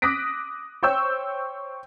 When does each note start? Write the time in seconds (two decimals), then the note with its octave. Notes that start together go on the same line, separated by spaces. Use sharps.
0.02 D6 D#6 F#6 A#6 B6 D7
0.83 C5 C#5 G5 C#6 E6 G6